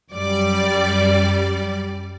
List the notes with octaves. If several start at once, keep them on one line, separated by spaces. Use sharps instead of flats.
F#2 G3 D5